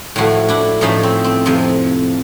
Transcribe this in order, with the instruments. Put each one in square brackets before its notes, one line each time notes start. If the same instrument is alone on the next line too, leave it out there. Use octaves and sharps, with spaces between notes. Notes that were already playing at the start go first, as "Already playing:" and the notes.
[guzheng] A2 F3 A3 E4 F#4
D4 E4
A2 F3 A3 C#4 D#4
C4
C4
F2 C3 F3